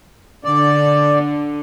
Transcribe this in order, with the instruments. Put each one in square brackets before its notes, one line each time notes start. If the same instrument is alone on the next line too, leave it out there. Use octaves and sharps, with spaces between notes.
[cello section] D3 [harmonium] D5